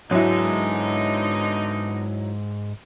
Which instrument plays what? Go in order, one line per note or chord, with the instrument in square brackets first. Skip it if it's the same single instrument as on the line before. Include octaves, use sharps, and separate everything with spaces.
[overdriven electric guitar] G#2 G#3 [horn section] D3 B3 D#4 [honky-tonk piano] F#3 E4